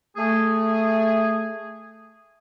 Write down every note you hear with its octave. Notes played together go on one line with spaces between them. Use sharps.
A3 G#4